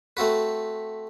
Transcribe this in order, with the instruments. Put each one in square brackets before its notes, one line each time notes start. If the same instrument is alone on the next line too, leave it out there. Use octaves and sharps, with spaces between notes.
[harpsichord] A3 C4 F#4 B4